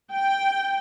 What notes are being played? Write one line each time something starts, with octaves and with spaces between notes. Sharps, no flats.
G5